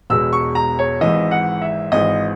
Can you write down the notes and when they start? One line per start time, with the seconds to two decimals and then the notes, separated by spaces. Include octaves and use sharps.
0.10 E1 E2 B2 G#3 E6
0.33 C#6
0.55 A#5
0.79 C#5
1.01 G#1 G#2 E3 D#5
1.31 F#5
1.62 E5
1.92 G#1 G#2 E3 D#5